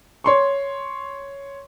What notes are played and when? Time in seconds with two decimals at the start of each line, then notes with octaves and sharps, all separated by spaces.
0.24 C#5 C6 C#6